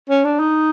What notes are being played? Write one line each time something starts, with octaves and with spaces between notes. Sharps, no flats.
C#4
D4
D#4